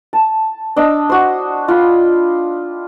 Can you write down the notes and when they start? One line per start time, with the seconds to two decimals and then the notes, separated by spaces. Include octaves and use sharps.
0.13 A5
0.76 D4 D#5 D6 E6
1.10 F#4 C5
1.68 F4 G5 B5